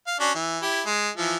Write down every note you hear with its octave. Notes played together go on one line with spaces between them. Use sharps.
F5
C#4 D4 F#4
E3
E4 G4
G#3
E3 F3